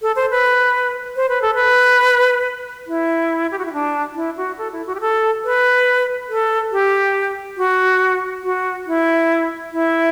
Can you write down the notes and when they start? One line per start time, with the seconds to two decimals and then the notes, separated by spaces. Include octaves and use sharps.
0.02 A4
0.16 C5
0.31 B4
1.16 C5
1.29 B4
1.42 A4
1.55 B4
2.87 E4
3.51 G4
3.58 F#4
3.65 E4
3.73 D4
4.15 E4
4.37 F#4
4.58 A4
4.72 E4
4.87 F#4
4.95 G4
5.00 A4
5.44 B4
6.29 A4
6.72 G4
7.57 F#4
8.43 F#4
8.87 E4
9.72 E4